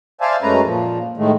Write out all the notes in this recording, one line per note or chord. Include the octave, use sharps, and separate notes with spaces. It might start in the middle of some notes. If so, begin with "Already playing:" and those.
C5 D5 E5 F5 G#5 A5
F#2 G#3 A3 C#4 B4 A#5
A#2 F3
A2 D#3 G#3 A3